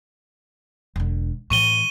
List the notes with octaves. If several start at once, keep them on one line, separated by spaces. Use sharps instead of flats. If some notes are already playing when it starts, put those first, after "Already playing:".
E1 D3
A2 E3 C#6 D#7 G7